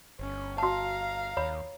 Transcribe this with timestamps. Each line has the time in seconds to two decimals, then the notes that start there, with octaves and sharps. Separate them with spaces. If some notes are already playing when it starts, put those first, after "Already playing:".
0.19 G1 C#4
0.58 F#4 F5 A5 A#5
1.37 D#2 C#5 B5